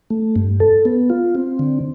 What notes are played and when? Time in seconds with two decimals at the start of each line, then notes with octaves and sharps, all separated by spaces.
0.10 A3
0.36 G2
0.60 A4
0.85 B3
1.10 F4
1.35 C4
1.59 D3